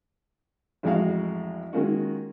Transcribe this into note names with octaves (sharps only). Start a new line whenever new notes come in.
A1 F2 G#3 F#4 F5
D#3 G#3 A#3 C#4 F4 F#4